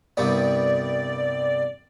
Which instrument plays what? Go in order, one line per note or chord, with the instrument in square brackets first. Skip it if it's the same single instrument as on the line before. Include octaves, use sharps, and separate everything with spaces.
[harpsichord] C2 G2 B3 [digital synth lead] D5